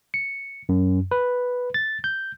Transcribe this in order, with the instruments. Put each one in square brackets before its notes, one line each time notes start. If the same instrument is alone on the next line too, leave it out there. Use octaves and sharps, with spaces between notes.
[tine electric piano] C#7
F#2
B4
A6
G6